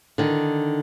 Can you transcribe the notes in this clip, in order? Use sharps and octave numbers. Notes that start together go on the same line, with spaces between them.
D3 D#3